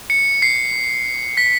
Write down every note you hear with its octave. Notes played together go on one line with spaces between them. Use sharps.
C#7
C7
B6